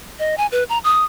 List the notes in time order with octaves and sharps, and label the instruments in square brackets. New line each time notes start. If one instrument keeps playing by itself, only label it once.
[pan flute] D#5
G#5
B4
A#5
D#6